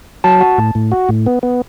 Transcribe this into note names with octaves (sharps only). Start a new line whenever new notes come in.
F#3 A5
F#4
A2
A2
F#4
A2
B3
B3